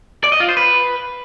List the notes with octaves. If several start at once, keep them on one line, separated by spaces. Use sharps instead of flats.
D5
D#5
F4
C5
B4